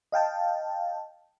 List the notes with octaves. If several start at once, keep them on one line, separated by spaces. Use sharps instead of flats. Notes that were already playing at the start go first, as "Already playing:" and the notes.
D#5 F5 G5 A5